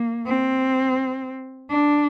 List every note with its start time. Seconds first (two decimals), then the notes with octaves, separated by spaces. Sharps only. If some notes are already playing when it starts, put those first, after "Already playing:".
Already playing: A#3
0.26 C4
1.71 D4